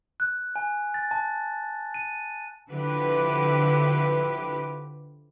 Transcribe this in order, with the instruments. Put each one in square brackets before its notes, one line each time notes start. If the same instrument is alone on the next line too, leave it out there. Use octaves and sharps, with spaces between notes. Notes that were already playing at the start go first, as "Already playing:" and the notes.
[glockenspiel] F#6
G#5
A6
A5
D#7
[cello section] D3 F3 E4 G4 B4